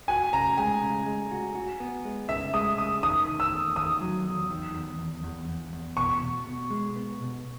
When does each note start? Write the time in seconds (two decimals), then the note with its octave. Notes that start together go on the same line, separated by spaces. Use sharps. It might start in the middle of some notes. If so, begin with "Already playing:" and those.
0.08 F#4 G#5
0.33 C#3 A#5
0.57 G#3 G#5
0.83 C#3
1.06 G#3
1.31 F#4
1.55 F#4
1.80 B3
2.05 G#3
2.29 C#3 E5
2.54 G#3 D#6
2.78 C#3 D#6
3.03 D#3 D#6
3.28 D#3
3.40 E6
3.52 E2
3.76 D#3 D#6
4.01 F#3
4.26 E2
4.50 D#3
4.75 E2
4.99 E2
5.23 E2
5.48 E2
5.73 E2
5.97 B2 C#6
6.22 B2
6.47 B2
6.70 G#3
6.96 B3
7.20 B2